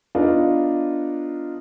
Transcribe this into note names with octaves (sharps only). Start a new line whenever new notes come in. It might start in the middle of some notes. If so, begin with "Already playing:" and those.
B3 D4 D#4 F4